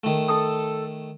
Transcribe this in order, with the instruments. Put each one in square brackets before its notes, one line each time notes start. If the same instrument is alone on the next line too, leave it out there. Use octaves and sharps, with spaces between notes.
[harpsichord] D#3 A3
[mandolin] A4 D#6